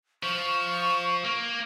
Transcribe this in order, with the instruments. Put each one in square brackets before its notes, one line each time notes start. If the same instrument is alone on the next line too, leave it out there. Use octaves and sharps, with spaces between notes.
[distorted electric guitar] F3 [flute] C#6
[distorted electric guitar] A#3